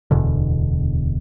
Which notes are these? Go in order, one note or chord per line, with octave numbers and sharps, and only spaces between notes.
D1 E2 B2 D3